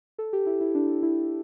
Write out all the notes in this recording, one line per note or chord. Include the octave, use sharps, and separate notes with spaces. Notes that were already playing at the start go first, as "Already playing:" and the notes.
A4
G4
E4
E4
D4
E4